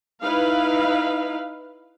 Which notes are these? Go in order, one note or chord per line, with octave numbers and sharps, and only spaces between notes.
D#4 E4 B4 F5